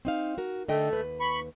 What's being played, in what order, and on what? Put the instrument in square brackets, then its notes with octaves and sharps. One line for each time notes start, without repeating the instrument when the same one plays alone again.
[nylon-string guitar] C4 D#4 F5
F#4 A#4
[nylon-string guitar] D3 D#5 G5 [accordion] A3
[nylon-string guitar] D#2 B4
[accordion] B5 C#6